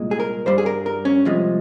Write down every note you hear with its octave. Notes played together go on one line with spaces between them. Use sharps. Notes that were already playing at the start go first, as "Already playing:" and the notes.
Already playing: C2 A#2 G#3
G#4
A#4
G2 G3 C5
G#4
A#4
A#4
C#4
C2 C3 F3 G#3